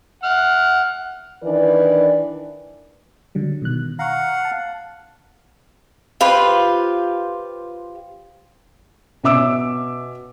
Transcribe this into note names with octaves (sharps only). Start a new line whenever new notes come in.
F#5 F6
D#3 E3 D4 B4 D5
D3 F#3 G3
B2 D#3 F#6
F5 F#5 A#5 C#6
A5
F4 G4 B4 C5
B2 C#4 E5 D6 E6 D7